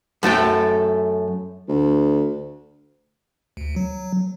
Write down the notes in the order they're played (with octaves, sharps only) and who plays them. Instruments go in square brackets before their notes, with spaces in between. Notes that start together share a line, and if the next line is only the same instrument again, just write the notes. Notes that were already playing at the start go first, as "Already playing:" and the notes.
[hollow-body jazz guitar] F#2 A3 A4 G5
[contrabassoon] D2
[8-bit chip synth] D2
F#3